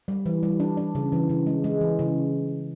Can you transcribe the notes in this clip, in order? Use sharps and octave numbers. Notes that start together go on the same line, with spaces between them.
G3
E3
G3
D4
D4
C#3
E3
C#3
G#3
G#3
E3
C#3